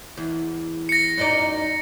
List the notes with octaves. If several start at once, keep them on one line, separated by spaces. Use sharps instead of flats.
E2
A#6 C#7
F#2 D#4 D5